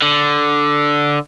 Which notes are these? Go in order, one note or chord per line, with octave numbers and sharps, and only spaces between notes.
D3